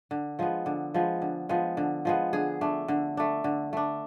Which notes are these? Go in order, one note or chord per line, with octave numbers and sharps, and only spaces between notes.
D3
F3 G#3 B3
D3
F3 G#3 B3
D3
F3 G#3 B3
D3
F3 G#3 B3
D3 G#4
A3 D4
D3
A3 D4
D3
A3 D4